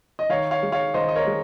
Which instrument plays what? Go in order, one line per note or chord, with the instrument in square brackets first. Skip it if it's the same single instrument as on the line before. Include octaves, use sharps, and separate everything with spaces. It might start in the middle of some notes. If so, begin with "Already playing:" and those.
[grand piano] D#5
D#3 C#5 F5
C#5 F5
G#3
C#5 F5
D#3 C5 D#5
D#5
A#4 C#5
G#3